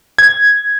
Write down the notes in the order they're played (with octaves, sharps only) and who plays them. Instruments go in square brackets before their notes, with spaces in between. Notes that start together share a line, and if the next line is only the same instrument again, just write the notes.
[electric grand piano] G#6